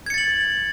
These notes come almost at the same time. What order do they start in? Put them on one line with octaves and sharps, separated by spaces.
G#6 C#7 A6 F#7